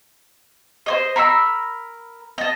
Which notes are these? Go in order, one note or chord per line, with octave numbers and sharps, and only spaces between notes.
C5 C#5 D#5
A#4 B5 C6 E6
D#5 A5